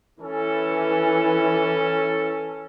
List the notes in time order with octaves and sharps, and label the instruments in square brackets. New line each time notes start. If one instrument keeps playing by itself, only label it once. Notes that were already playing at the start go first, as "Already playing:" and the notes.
[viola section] E3 [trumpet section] C#4 A4